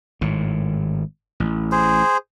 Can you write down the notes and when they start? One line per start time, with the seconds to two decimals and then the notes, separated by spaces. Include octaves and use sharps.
0.21 G#1 A2
1.40 A1
1.72 G#4 C5